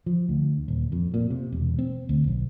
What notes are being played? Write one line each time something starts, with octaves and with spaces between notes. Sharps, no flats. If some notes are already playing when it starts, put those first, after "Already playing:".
F3
D2
D#1
F2
A#2
C3
E1
C4
D2
B1